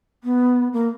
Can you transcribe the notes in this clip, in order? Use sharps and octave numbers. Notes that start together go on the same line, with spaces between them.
B3
A#3